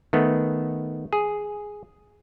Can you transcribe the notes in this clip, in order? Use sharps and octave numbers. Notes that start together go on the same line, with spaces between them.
D#3 A3 B3
G#4